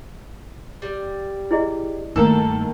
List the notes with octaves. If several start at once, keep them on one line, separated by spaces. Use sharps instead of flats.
G3
E4 G#4 D#5
G2 D#3 A3 A#3 A4 A#5 E6